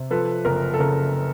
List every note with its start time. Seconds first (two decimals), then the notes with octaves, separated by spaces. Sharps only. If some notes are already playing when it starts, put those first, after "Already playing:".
Already playing: C3
0.11 F3 A4 B4
0.45 F#1 A#4
0.74 A4
0.80 C#3 A#4